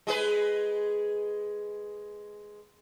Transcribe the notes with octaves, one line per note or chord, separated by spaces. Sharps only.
G#3 G#4 B4